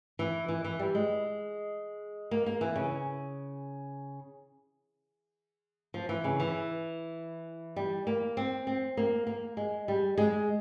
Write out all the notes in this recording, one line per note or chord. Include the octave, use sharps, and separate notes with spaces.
E3
E3
E3
G3
G#3
A#3
A#3
E3
C#3
F3
E3
C#3
E3
G3
A#3
C4
C4
A#3
A#3
G#3
G3
G#3